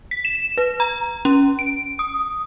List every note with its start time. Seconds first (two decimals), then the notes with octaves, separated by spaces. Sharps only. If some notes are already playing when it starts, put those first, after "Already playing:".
0.11 B6
0.25 E7
0.57 B4
0.80 A#5
1.25 C#4
1.59 D7
1.99 D#6